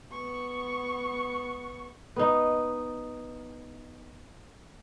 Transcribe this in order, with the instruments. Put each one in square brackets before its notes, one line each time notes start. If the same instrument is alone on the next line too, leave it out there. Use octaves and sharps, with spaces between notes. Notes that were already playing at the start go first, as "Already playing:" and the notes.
[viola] B3 C#6
[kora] B3 D#4